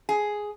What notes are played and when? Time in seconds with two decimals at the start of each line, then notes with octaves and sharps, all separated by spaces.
0.09 G#4